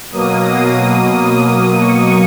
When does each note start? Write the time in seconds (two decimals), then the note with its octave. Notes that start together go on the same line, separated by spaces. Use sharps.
0.12 B2 F#3 A#3 D#6
0.94 D#6
1.76 C#6